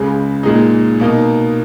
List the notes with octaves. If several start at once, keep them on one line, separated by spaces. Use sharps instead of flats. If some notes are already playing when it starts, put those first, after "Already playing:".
Already playing: C#2 C#3 G#3
A#2 G#3 D#4
B2 A#3 D#4